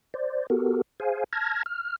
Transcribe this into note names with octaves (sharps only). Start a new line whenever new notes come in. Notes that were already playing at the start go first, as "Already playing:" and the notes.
C5 D5
B3 F#4 G4 A4 A#4
G#4 C5 F5 G#5
A5 F6 G#6 A#6
F6